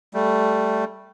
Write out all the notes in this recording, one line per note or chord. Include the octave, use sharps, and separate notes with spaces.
G3 A3